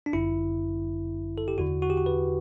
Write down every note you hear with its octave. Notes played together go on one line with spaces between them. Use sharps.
D4
G1 F#2 D3 E4
A4
G4
E2 D3 F#4
F#4
G4
F#4
B4